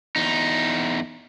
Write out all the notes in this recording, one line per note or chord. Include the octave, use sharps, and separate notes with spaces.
E2 D#4